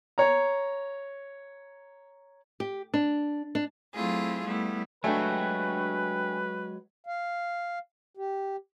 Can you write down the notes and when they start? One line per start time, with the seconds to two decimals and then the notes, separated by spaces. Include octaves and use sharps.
0.18 C#5 A#5
2.60 G4
2.94 D4
3.55 D4
3.94 F#3 A3 C4 E4 F4 G#4
4.44 G3 A3 B3 E4
5.04 F#3 G#3 A3 D4 F#4 B4 G5 G#5
7.07 F5
8.17 G4